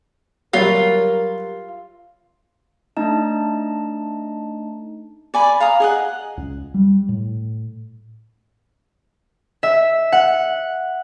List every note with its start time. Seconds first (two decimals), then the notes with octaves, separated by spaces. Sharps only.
0.53 F#3 G3 F4 A#4
2.97 A3 D4 D#4 D#5 A5
5.34 D5 G#5 B5
5.60 F5 A#5 D#6
5.80 G#4 D#5 F#5
6.37 C#2
6.74 G3
7.09 A2
9.63 E5
10.12 F#5